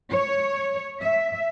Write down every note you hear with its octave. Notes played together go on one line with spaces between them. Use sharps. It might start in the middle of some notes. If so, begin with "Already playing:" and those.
C#5
E5